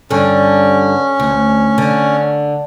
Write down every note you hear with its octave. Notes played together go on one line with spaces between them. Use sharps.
G2 D3 C#4
D2
D3